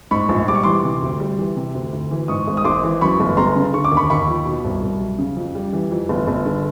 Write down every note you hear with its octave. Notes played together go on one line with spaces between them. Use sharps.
G#2 B5 C#6
A#1
G3 D6
C#6
E3 C6 D6
C3
D2
G3
E3
C3
D2
D2
E3
G#2 C#6 D#6
G#1
D#6
G#1 C6 D6
E3
F#2 B5 C#6
G1
G1 A#5 C6
C#3
D3 C#6
D6
D#2
B5 C#6
D#2 B5 C#6
F3
B2
C2
C2
F#3
C#3
F2
G3
E3
F2
G1
G1
D3